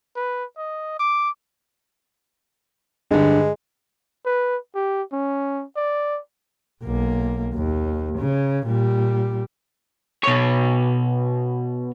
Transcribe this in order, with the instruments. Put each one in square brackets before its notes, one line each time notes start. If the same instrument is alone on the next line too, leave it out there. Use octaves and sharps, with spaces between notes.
[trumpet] B4
D#5
D6
[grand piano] G2 D3 [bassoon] G#3
[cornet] B4
G4
C#4
D5
[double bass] B1 A#3
D#2
C#3
A#2 G3
[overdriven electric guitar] B2 C#5